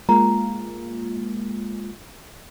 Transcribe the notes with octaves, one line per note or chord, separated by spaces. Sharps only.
G#3 A#3 F4 A#5